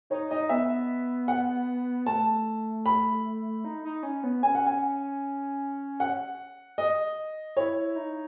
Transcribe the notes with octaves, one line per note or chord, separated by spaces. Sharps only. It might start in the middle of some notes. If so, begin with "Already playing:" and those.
D#4 C#5
D#4 D#5
B3 E5
F#5
A3 A5
B5
D#4
D#4
C#4
B3
C#4 G#5
F#5
G#5
F#5
D#5
E4 C#5
D#4